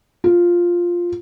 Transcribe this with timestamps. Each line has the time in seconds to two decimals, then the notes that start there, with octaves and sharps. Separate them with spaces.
0.24 F4